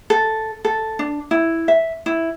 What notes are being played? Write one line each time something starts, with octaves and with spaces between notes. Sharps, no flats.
A4
A4
D4
E4
E5
E4